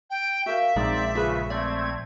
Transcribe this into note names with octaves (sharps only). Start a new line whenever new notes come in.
G5
F#4 A#4 E5 F5
A#1 G#3 C4 D#4 D5
C#3 F4 G#4 B4
A3 C4 D5 G#6